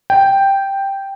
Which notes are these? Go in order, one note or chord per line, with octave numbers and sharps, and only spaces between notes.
G5